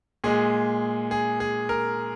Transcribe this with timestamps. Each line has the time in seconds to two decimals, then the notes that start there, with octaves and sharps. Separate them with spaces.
0.24 A#2 G#3 G#4
1.11 G#4
1.40 G#4
1.69 A#4